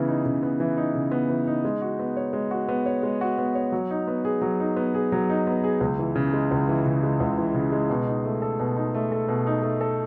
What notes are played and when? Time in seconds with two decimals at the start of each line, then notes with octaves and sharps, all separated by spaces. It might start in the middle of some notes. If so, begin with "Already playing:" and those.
Already playing: C#3 E3 B3
0.08 D#4
0.26 C#3
0.43 B3
0.60 E3
0.77 D#4
0.95 C#3
1.11 B3
1.30 E3
1.47 D#4
1.65 G#3
1.82 F#4
1.99 B3
2.16 C#5
2.33 G#3
2.51 F#4
2.68 B3
2.86 C#5
3.03 G#3
3.21 F#4
3.38 B3
3.55 C#5
3.72 F#3
3.91 D#4
4.07 B3
4.25 G#4
4.42 F#3
4.60 D#4
4.76 B3
4.95 G#4
5.12 F#3
5.30 D#4
5.47 B3
5.64 G#4
5.81 C#2
5.99 E3
6.15 C#3
6.33 G#3
6.51 C#2
6.69 E3
6.86 C#3
7.03 G#3
7.20 C#2
7.38 E3
7.54 C#3
7.72 G#3
7.90 B2
8.08 D#4
8.25 A3
8.42 A4
8.59 B2
8.77 D#4
8.94 A3
9.12 A4
9.28 B2
9.47 D#4
9.63 A3
9.81 A4